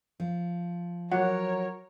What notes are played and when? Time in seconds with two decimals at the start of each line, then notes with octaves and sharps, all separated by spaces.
0.20 F3
1.12 F#3 A#4 C#5 F#5